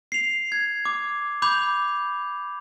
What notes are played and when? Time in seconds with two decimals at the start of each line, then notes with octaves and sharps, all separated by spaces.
0.12 C7 F7
0.52 G#6
0.85 D6
1.42 B5 D6 G6 F7